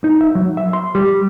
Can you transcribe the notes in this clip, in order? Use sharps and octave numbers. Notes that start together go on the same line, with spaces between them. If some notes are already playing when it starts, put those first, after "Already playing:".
D#4
E5
F#3
E5
C6
G3